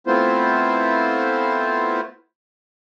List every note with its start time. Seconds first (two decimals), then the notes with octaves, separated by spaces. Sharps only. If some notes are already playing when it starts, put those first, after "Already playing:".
0.07 A3 B3 C4 E4 F4 C5